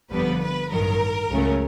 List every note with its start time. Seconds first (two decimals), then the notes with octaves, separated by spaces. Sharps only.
0.11 G1 F2 D3 G3 B3 B4
0.40 B4
0.70 A1 G2 D#3 F#3 A#4
1.29 C#2 C#3 F#3 A3 C#4